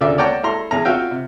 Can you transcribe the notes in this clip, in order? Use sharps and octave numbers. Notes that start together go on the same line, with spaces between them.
D2 C#3 F4 D5 E5
C#5 D5 F#5 G5 A5 A#5
E4 A4 A#5 C6
E2 G#4 A#5
F4 F#4 E5 F5 G5
C3